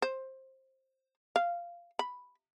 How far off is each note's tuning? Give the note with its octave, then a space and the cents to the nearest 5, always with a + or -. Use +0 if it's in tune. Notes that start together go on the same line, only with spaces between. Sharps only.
C5 +15
F5 -10
B5 +0